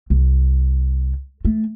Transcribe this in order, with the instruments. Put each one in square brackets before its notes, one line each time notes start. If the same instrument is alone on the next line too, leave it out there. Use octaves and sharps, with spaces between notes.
[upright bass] C2
A3